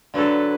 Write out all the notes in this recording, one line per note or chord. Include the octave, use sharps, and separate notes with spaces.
D3 F#3 D4 A4 B4